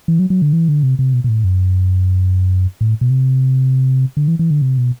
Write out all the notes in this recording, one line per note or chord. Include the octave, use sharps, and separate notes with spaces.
E3
F#3
F#3
D3
E3
D3
C3
C3
B2
B2
A2
F#2
A2
B2
C3
D3
E3
E3
D3
C3
B2